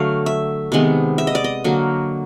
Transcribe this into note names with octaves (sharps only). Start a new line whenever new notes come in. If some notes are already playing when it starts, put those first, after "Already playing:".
Already playing: D3 F#3 A3 F5
E5
C3 D#3 G#3 B3
E5
D#5
D5
D#5
D3 F#3 A#3